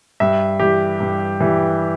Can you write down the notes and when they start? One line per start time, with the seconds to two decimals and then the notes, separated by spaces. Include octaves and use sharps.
0.20 G2 E5
0.59 E3 G3 G4
1.00 G2
1.40 E3 G3